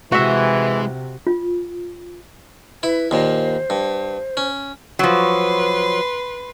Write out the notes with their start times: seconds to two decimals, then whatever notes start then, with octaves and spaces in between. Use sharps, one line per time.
0.12 C3 E3 G#3 F#4 E5
1.27 F4
2.83 E4 B4
3.11 D#2 A#2 C5
3.70 G2
4.37 C#4
4.99 F3 F#3 B4 C6